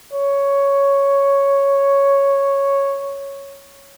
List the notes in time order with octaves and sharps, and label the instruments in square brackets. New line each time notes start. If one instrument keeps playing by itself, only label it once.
[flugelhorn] C#5